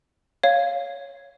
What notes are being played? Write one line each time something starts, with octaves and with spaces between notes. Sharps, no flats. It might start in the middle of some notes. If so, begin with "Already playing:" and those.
C#5 F5